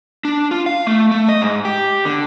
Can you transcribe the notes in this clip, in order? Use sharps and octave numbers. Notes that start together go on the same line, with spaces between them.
D4
F4
F5
A3
A3
D#5
G#2
G4
D3